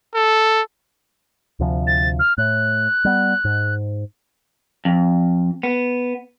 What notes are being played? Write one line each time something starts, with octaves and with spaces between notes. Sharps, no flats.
A4
D2 C3 F3
A6
F6
A2 F#6
G3 B3
G#2
F2
B3